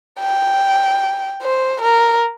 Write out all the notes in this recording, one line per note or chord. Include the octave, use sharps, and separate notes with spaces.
G5
C5
A#4